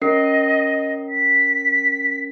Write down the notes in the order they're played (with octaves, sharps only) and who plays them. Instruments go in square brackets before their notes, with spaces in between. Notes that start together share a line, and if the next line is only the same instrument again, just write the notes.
[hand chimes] C#4 A#4 C7 [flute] D#5
[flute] B6